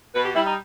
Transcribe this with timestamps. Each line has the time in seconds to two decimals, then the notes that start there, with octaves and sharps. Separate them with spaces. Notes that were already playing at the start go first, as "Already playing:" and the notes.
0.14 B2 B4
0.25 G4
0.35 G3 E4
0.46 D#4